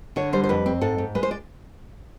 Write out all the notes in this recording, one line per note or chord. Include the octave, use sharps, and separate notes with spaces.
D3 C#5
G3 C5
C5
F2 B4
C4
G#2 A4
G#2
G#3 B4
C5
D5